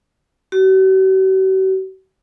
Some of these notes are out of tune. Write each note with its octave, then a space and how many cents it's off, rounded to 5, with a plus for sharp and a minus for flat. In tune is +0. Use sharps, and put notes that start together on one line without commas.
F#4 +45